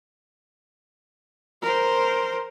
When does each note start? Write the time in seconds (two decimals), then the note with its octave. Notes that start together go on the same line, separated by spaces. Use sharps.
1.62 A#4 C5